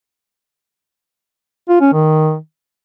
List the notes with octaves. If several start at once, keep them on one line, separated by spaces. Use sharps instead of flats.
F4
C#4
D#3